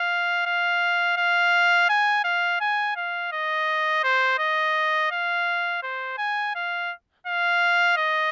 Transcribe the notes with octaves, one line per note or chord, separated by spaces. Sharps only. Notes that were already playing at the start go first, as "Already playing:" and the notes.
Already playing: F5
F5
F5
G#5
F5
G#5
F5
D#5
C5
D#5
F5
C5
G#5
F5
F5
D#5